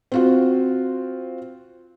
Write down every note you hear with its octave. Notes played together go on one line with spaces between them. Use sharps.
C4 F4 F#4